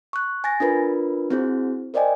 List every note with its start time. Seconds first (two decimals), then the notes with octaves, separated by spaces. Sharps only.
0.13 C#6 F#6
0.44 G#5 A6 A#6
0.60 D4 F4 A#4 B4
1.30 C4 E4 F#4 G#4 C5
1.94 A#4 C5 D5 D#5 G5 G#5